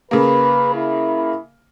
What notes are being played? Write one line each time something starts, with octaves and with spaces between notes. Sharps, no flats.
C#3 A#3 B4
E4